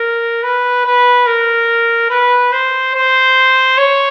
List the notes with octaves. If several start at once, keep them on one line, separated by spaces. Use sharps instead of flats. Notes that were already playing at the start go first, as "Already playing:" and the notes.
Already playing: A#4
B4
B4
A#4
B4
C5
C5
C#5